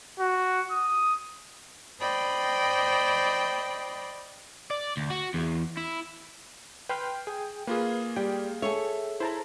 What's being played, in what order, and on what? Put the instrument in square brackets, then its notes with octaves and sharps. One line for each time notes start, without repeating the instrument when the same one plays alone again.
[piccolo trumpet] F#4
D#6
[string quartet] C5 D5 D#5 G5 B5
[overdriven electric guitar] D5
D2
F#4
E2
E4
[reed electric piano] B4 C6 F6 [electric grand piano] G5
[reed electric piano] G#4 G#5
[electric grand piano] A#3 F4 G#4 [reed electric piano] B4
[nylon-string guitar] G3 [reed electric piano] G5
[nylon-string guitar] G#4 A4 C#5 [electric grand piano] E5
[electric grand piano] E4 [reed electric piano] C5 A5 A#5